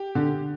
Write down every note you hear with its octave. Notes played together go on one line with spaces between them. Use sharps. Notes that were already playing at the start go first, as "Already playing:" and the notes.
Already playing: G4
D3